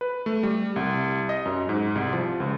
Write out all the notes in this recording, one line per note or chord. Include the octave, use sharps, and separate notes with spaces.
B4
A3
G3
C2
D#5
F#2
G#2
C2
F3
C#2